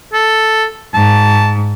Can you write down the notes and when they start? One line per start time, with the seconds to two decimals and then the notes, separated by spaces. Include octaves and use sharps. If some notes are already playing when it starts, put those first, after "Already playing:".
0.13 A4
0.94 G#2 A5